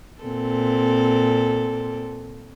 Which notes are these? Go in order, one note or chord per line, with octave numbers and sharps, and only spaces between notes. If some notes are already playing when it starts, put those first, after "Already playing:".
A#2 C4 A4